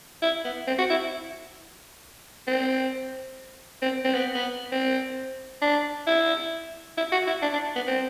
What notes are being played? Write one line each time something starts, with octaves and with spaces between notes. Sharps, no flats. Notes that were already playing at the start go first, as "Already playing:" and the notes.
E4
B3
C4
F#4
E4
C4
C4
C4
B3
B3
C4
D4
E4
E4
F#4
E4
D4
D4
B3
C4